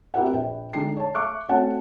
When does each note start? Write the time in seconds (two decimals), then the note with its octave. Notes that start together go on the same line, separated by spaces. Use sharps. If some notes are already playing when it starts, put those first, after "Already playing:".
0.14 C4 E4 G4 A#4 E5 F#5
0.32 A#1 B4 G5
0.73 D3 G#3 D4 D#4 G5 C7
0.97 C#5 A5
1.15 E5 F5 C#6 D6 F#6
1.49 A3 C4 C#4 F#4 F#5 A5